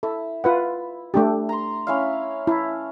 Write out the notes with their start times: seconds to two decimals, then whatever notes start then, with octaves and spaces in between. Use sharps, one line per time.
0.03 E4 A4
0.44 F4 B4 F#5
1.14 A3 D4 G4
1.49 A#5 C6
1.87 C#4 E4 F5
2.47 E4 A5